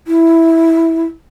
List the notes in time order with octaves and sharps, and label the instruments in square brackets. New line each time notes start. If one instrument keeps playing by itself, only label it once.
[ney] E4